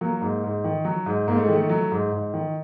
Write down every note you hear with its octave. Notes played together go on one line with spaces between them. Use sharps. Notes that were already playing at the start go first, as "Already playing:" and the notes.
F#3 A#3
G#2
G#2
D#3
F#3
G#2
G#2 A#3
A3
G#3
D#3 A3
F#3
G#2
G#2
D#3